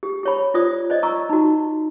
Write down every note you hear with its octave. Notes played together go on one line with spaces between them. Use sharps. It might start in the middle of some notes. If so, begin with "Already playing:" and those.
G4
G4 C#5 B5
F4 C5 D5 D#6
C5 D5 D#5
A#5 C#6 E6
D#4 F#4